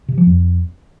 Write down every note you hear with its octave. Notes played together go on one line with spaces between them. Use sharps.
C3
F3
F2